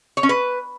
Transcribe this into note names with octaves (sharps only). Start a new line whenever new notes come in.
C#5
C#4
B4